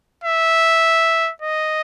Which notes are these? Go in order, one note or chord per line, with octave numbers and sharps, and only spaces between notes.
E5
D#5